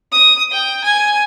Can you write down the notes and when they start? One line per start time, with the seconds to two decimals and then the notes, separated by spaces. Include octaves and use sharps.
0.12 D#6
0.51 G5
0.84 G#5